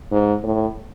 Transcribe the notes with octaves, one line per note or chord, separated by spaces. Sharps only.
G#2
A2